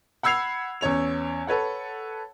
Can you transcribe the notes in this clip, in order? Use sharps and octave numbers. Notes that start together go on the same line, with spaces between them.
F#5 B5 E6 G#6 C7 F7
E2 C#4 C#5 F7
A4 B4 C#5 F#5